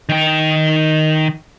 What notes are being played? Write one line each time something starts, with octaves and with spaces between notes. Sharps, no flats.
D#3 G5